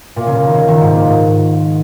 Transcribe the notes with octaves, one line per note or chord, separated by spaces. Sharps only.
A#2
C#3
A#2
D#3
C#3
D#3
G#2
A#2
G#2